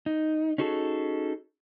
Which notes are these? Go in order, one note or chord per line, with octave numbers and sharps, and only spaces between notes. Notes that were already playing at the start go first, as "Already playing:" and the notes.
D#4
C#4 D#4 F#4 G#4 A4